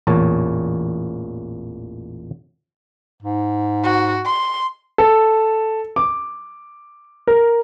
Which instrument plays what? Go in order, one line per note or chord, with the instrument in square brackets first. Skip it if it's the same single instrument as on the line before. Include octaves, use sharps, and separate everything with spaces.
[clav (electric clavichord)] A1 E2 A#2 C#5 A5
[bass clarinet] G#2
[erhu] F#4
C6
[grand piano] A4
D6
A#4